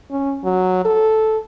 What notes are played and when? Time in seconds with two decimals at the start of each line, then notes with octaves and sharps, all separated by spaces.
0.11 C#4
0.44 F#3
0.85 A4